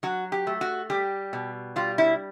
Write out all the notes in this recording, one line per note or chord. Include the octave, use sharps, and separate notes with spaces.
F#3 F#4
G4
A3
F#4
G3 G4
B2
G3 F4
E4